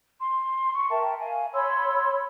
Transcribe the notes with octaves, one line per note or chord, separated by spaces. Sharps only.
C6
C#6
A#4 E5 G5 A5
F5 G#5
C#5 B5 C6 E6